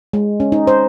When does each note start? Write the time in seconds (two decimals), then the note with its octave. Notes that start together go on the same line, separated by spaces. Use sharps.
0.13 G#3
0.40 C#4
0.52 D#4
0.67 C5